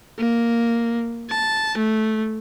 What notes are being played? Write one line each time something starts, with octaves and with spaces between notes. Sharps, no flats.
A#3
A5
A3